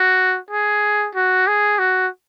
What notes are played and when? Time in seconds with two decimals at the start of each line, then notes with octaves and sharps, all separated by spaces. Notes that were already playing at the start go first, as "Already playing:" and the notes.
Already playing: F#4
0.51 G#4
1.15 F#4
1.47 G#4
1.79 F#4